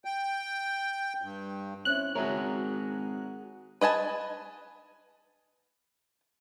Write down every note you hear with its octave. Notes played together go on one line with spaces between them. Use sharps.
G5
G2
C4 C#4 E4 F#6
G#1 F#4 G#4 A#4 C#5 E5 A#5
B4 D#5 G#5 A5